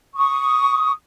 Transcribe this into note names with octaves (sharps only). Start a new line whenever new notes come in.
C#6 D#6